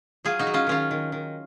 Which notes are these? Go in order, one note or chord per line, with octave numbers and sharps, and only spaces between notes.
F#3 F4 G#4
D#4 F#4
F#3
C#4 F4
D#3 C#4 F4
D#3
D#3